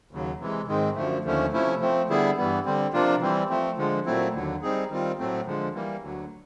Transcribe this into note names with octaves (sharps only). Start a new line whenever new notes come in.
D#2 C#3 F#3
C3 E3 G#3
G#2 D#3 G#3 C4
F#2 D3 F3 A3
D#2 D3 F3 A3 C#4
C3 F3 A3 C#4 E4
F3 A3 C4
D3 G3 B3 E4 G#4
G2 E3 G3 B3
D3 G3 C4
C3 F3 A#3 D4 F4
E3 G3 C4
F3 A3 C4
D3 F3 G#3
A#2 F#3 A3 C4 E4
D#2 D3 F#3
G3 C4 D#4 G#4
D#3 G3 C4 F4
A2 F#3 A3 C4
D3 F3 G#3
E3 G3 A#3
D2 D3 F#3